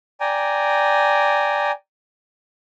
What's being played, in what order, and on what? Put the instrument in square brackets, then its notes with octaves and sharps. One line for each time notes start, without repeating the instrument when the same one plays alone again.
[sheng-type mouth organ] D5 G5 G#5 A#5